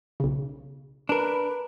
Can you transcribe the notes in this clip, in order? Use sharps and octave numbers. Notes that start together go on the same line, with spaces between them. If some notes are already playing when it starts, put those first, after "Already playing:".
B1 C#3
D4 A#4 B4